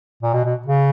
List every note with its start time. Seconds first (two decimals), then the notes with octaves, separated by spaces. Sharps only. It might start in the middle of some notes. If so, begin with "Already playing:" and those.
0.23 A#2
0.34 B2
0.45 B2
0.66 C#3